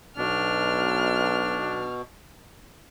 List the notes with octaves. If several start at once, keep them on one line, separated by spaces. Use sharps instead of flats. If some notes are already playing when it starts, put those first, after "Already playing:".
B1 B2 D4 F6